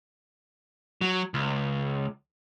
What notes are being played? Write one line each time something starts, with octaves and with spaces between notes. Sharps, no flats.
F#3
C#2